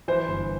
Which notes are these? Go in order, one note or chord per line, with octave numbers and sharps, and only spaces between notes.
E3 C5
G1